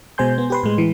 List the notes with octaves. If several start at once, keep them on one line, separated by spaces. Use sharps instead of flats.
B2 G#3 C5 G#5 C6 G6
B3
G4 B4 C6
A2 G#3
E3